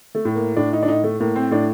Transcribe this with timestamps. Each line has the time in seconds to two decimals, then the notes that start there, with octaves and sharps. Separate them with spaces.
0.15 A3
0.25 A2
0.35 A#3
0.56 A2 D4
0.73 D#4
0.83 D4
0.88 A2 D#4
1.04 A3
1.20 A2 A#3
1.35 C4
1.51 A2 D4